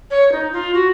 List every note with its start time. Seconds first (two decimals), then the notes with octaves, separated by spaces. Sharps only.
0.11 C#5
0.32 D#4
0.53 F4
0.74 F#4